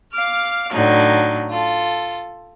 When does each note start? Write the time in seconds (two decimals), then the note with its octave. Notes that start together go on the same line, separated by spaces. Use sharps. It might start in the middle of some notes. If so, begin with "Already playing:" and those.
0.14 F5 D6 F6
0.73 A2 D3 F#3 D#4
1.50 F4 A4